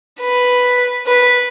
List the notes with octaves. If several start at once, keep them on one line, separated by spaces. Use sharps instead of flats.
B4
B4